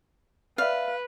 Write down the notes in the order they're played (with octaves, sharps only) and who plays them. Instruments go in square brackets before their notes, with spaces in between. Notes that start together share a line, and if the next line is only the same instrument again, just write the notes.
[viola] B4 [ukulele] D5 E5 [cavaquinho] F5